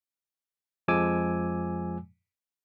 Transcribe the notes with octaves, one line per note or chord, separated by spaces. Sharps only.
F2 F3 G#3 G#5 D6 E6